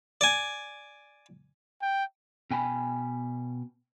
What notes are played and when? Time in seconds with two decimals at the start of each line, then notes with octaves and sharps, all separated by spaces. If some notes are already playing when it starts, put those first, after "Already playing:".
0.21 D5 G#5
1.82 G5
2.51 B2 G5 G#5 B5